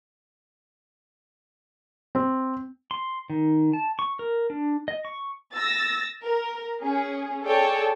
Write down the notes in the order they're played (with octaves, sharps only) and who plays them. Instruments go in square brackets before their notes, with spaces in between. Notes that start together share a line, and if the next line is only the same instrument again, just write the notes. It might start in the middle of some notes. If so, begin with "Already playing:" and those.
[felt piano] C4
[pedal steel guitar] C6
D#3
A5
C#6
A#4
D4
D#5
C#6
[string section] E6 A6 A#6
A#4
C#4 G#4
G#4 A4 C#5 D5 G5 A5